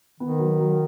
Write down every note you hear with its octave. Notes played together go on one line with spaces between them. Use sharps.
D#3 B3
F#3
F#3